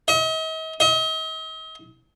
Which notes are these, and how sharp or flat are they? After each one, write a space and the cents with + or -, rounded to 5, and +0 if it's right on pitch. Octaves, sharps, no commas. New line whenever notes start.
D#5 +45
D#5 +45